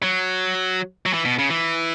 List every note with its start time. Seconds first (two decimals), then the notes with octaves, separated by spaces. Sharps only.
0.03 F#3
1.06 F#3
1.13 E3
1.25 B2
1.39 C#3
1.50 E3